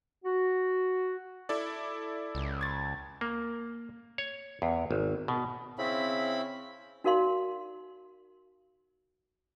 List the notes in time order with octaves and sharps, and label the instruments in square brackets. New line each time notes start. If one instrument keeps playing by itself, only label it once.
[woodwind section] F#4
[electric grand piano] E4 A4 D5
[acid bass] C#2
[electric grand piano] G#6 A6
[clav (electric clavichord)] A#3
C#5
E2
G#1
B2
[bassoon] C#3 [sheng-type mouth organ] C4 E4 B5
[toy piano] D#4 F#4 A#4 D5 F5 C6